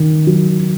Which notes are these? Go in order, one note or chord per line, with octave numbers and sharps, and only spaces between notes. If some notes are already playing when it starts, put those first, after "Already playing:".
Already playing: D#3
F#3